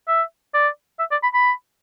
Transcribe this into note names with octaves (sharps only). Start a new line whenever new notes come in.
E5
D5
E5
D5
B5
B5